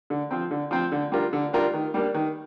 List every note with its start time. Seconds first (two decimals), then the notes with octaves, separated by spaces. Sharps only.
0.10 D3
0.31 F3 C4
0.51 D3
0.71 F3 C4
0.92 D3
1.12 G3 D4 F4 A#4
1.33 D3
1.53 G3 D4 F4 A#4
1.74 D#3
1.94 G3 A#3 D4
2.15 D#3